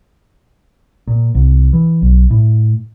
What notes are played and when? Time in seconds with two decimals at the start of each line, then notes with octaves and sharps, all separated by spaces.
1.08 A#2
1.35 C2
1.73 E3
2.02 B1
2.31 A2